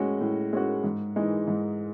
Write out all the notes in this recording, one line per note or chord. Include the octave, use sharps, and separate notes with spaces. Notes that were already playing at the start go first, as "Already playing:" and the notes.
Already playing: A2 G#3 C#4 F#4
A2
G#3 C#4 F#4
G#2
E3 G#3 D#4
G#2